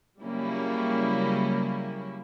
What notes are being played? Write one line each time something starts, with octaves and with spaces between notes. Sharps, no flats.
C#3 F#3 G3 A#3 C#4 E4